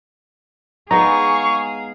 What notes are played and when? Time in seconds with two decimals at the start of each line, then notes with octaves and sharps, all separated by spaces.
0.91 G#3 B3 D#4 G#4 F5 A#5 C#6